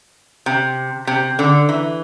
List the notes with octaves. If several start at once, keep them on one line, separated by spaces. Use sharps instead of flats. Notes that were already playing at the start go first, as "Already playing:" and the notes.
C3
C3
D3
E3